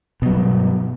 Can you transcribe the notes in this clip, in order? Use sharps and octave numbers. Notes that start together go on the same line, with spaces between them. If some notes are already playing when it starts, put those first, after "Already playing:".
G2 B2 F#3